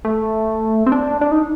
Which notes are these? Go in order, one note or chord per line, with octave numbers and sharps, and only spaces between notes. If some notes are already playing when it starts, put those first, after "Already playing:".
A3
C4
D4
D4
D#4